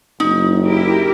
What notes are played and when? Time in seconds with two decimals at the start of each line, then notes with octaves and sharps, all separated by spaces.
0.20 F#1 D#4
0.66 E4 G4 A#4